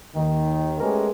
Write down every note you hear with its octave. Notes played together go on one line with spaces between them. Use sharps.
D#2 D#3
G#3 A3 B3 C#4 G4 A#4